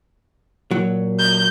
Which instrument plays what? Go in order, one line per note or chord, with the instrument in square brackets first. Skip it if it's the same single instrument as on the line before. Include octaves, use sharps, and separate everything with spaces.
[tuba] A#2 [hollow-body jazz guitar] F#3
[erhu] G6